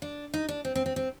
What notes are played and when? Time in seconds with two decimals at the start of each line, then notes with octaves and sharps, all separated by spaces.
0.02 D4
0.34 D#4
0.49 D4
0.65 C4
0.75 C4
0.86 C4
0.96 C4